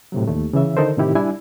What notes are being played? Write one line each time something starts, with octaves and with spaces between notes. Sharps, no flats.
A2 C3 F#3
D#2 A3
C#3 E3 E5
D3 D#3 D#4 A4 A#4 C5
A2 C3 D#3 E4 G4
G3 D4 E4 G#5